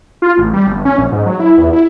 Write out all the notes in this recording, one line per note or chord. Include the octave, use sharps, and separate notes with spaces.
F4
A1
G3
G1
C#4
A#1
G#2
F#3
E4
E2
E4